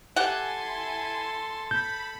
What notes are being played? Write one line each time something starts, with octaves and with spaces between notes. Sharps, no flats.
E4 G4 A4 F#5 G#5 C6
B5 G6